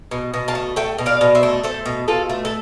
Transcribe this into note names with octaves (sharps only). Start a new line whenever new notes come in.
B2
B2
F5 A5
A3
A3 E5 G5
B2
D5 F5
B2
C5 E5
A3
A3 A4 C5
B2
B2 F4 A4
A3
A4